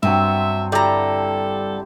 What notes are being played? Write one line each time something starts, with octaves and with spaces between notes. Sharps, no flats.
G2 F#3 B3 C4 E5 C6
D3 E4 G4 A4 C5 A#5